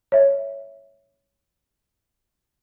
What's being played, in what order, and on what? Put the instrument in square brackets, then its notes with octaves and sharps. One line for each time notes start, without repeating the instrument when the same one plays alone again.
[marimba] C#5 E5